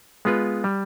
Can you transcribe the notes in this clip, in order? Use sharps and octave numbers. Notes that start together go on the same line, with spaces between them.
G#3 B3 F4 B4
G3